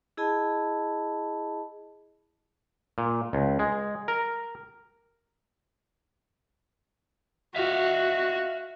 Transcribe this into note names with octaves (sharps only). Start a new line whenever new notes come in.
E4 G#4 D#5 A5 B5
A#2
C#2
G#3
A#4
F#4 E5 F5